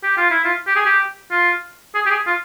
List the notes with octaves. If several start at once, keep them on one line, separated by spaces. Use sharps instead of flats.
G4
F4
E4
F4
G4
G#4
G4
F4
G#4
G4
G#4
F4